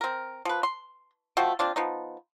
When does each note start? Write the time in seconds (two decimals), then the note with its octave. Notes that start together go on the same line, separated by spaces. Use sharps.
0.01 C4 A#4
0.45 F3 B4
0.63 C6
1.37 F3 A3 F#4 G5
1.59 C4 D4 F4
1.76 F3 B3 D#4